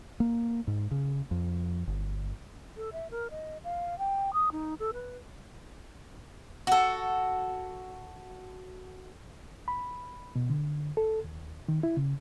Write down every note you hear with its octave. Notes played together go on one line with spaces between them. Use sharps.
A#3
G#2
C#3
F2
G1
A4
E5
A#4
D#5
F5
G5
D#6
D#4
A4
B4
F#4 A4
B5
B2
D3
A4
D#2
D#3
E4
C#3